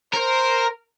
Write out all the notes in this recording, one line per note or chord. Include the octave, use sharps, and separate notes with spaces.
A#4 C5